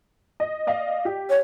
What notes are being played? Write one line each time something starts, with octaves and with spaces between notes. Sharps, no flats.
D#5
D5 D#5 F5
G4
C#5